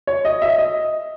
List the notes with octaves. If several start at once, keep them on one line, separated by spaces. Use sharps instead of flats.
C#5
D#5
E5
D#5